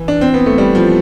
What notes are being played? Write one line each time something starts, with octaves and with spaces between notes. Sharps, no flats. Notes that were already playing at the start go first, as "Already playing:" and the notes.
Already playing: E3
D4
C4
B3
A3
G3
F3